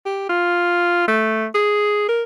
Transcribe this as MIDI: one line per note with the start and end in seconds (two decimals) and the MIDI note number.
0.05 0.27 67
0.29 1.07 65
1.08 1.47 57
1.55 2.06 68
2.08 2.23 70